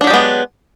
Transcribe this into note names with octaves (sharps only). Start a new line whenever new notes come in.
F#3 G#3 B3 D4 G4